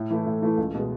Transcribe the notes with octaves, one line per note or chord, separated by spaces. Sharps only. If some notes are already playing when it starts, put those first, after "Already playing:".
Already playing: A2
E3 A3 E4
A2
E3 A3 E4
C#2
B2 G#3